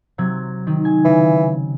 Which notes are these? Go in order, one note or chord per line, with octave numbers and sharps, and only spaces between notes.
C3 F#3 G#6
D#3
G#5
C#3 E3